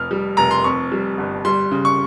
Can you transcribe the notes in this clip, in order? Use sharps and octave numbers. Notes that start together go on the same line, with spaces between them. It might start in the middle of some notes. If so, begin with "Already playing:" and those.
Already playing: F1 F2 F6
G3
F1 A#5
C6
F2 C#6
G3
G1
G3 C6
C#3
C#6